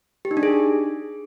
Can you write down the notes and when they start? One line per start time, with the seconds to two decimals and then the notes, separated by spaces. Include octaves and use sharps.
0.25 G4
0.31 D#4
0.37 D4
0.43 G#4